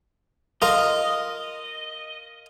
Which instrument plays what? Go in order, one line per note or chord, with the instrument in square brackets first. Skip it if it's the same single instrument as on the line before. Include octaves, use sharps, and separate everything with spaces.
[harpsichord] F4 A#4 [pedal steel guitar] D#5